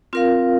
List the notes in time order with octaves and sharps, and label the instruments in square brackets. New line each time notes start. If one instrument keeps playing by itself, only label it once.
[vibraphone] C4 F4 A#4 F5